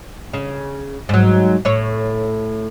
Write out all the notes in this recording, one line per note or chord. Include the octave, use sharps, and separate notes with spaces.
C#3
G#2 F#3
A2 C#5